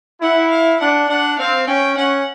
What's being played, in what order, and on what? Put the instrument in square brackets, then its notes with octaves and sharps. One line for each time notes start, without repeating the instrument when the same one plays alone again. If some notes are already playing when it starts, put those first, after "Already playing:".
[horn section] E4 [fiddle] F#5
[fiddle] F5
[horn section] D4 [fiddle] F#5
[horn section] D4 [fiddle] F#5
[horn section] C4 [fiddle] F5
[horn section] C#4 [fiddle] G5
[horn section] C#4 [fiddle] F#5